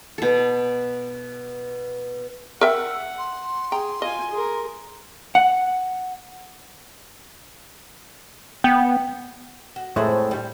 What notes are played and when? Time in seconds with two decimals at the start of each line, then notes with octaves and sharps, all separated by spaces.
0.18 B2 A4
2.61 A#4 E5 F#5 G5 E6
3.18 C6
3.72 G#4 G5 A#5
4.02 F4 D#5 G#5
4.31 G#4 A#4
5.35 F#5
8.64 B3 G5
9.76 F#4
9.96 F2 A2 G#3 A3 G#4 C5
10.31 G3